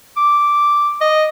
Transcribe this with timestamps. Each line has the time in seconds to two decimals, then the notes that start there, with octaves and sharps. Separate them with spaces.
0.17 D6
1.01 D#5